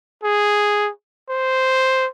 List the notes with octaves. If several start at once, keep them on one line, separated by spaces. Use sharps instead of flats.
G#4
C5